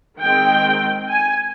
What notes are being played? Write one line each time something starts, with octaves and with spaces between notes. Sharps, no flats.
D#3 G#3 C4 G5
G#5